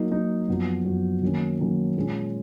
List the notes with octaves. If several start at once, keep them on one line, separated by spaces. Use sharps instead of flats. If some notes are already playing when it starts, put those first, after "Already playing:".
Already playing: F#3 A#3 D#4
F#3 A#3 D#4
F#2 F3 B3 F#4
F#2 F3 B3 F#4
D#3 F#3 A#3 C#4
D#3 F#3 A#3 C#4
A#2 G#3 C#4